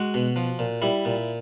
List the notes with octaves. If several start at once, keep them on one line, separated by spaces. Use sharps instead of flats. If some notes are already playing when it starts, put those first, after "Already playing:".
Already playing: G#3 F#4
B2
F3
A#2
G3 E4
A#2